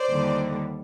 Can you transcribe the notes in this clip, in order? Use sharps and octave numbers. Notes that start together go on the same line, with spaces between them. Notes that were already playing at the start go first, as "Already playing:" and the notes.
Already playing: C5 D5
D#2 D3 G3